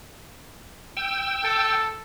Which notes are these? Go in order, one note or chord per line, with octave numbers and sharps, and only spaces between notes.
G5 E6
A4